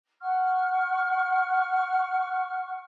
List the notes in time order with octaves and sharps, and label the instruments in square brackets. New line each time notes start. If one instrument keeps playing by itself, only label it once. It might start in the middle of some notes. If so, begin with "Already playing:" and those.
[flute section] F#5 C#6 F6